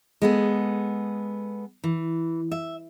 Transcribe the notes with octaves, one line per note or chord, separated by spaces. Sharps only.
G#3 B3 A4
E3
E5